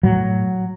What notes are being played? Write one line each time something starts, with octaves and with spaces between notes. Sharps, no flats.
A2 F#3